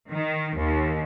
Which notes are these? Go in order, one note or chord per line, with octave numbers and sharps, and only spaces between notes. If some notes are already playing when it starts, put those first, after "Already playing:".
D#3
D#2